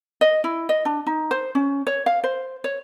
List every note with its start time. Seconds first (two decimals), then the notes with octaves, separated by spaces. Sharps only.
0.21 D#5
0.44 E4
0.69 D#5
0.85 D4
1.07 D#4
1.31 C5
1.55 C#4
1.87 C#5
2.06 F5
2.24 C5
2.64 C#5